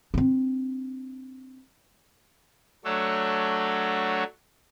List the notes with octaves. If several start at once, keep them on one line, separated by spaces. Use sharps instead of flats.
C4 D4
F#3 A3 D4 F#4 A4 C#5